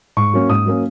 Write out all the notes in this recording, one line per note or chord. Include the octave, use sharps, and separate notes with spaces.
G#2 C#6
F#3 A#3 C#4
G#2 D#6
F#3 A#3 C#4